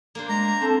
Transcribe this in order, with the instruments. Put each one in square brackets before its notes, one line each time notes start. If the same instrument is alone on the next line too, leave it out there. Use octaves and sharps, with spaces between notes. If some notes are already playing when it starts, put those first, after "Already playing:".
[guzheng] A#3 D4 C5
[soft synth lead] G#3 [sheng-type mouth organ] A#5
[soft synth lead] C4 [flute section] A4 A5 [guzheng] C5